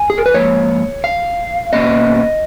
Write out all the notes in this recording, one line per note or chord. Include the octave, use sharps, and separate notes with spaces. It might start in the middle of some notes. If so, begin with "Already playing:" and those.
Already playing: G#5
G#4
A#4
B4
G#2 F3 A#3 C#5
F5
B2 A#3 C#4 D#5